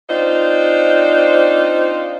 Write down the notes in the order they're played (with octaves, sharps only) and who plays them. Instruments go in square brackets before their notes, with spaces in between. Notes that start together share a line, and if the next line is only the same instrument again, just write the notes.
[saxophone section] C4 D4 D#4 F4 C5